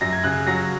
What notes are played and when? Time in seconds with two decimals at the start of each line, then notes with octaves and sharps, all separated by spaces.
0.01 F#2 A#6
0.13 G#6
0.24 C#3 F#6
0.47 F#3 A#6